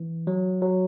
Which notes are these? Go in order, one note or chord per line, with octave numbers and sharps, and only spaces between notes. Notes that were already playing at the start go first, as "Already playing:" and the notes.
Already playing: E3
F#3
F#3